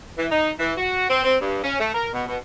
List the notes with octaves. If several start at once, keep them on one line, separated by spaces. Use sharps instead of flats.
E3
D#4
E3
F#4
C4
C4
G2
C#4
A3
A#4
B2
B2